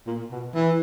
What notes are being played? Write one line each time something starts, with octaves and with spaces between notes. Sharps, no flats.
A#2
B2
E3